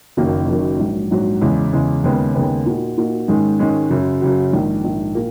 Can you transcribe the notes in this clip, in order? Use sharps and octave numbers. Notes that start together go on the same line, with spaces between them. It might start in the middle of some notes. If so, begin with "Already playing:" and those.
F#1 F#2 D#3 A#3
F#1 F#2 D#3 A#3
A#1 G#2 F#3
A#1 G#2 F#3
E2 C#3 G#3
E2 C#3 G#3
D#2 C#3 G#3 B3
D#2 C#3 G#3 B3
A#2 A#3 D#4 F#4
A#2 A#3 D#4 F#4
G#2 D#3 G#3 C#4
G#2 D#3 G#3 C#4
F#2 C#3 F#3
F#2 C#3 F#3
A#1 G#2 D#3
A#1 G#2 D#3
A#2 A#3